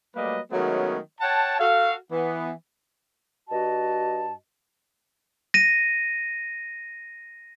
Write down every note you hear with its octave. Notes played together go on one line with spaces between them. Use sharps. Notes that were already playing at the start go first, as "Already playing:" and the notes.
F#3 G3 A3 A#3 B4 D#5
D#3 F#3 G#3 A3 B3 C#4
C#5 F#5 G5 A5
F#4 A4 F5
E3 B3
G2 F#4 D#5 A5
A#6 D#7